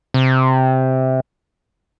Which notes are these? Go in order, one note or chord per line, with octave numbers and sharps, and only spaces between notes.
C3